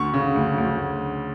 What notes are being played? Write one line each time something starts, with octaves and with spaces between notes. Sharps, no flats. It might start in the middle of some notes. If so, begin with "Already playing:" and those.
Already playing: D2 C#6
C#3
D2
D2